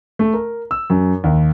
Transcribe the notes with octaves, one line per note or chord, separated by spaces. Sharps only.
A3
A#4
E6
F#2
D#2